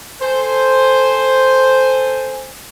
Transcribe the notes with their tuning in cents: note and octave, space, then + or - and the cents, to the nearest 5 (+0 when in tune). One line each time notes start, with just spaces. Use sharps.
A4 +0 C5 +0 G#5 -10